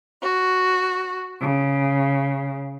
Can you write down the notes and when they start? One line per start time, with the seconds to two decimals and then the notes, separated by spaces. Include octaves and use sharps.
0.22 F#4
1.41 C#3